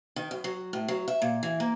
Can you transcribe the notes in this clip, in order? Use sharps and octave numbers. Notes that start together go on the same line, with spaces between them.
D#3
F#2
F#3
A2
F#3
E5
A#2
E3
A#3